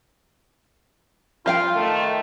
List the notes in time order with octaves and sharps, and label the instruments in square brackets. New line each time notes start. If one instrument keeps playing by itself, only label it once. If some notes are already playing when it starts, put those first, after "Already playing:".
[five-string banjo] F3 F5 G5 [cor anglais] F4
[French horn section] D#3 A3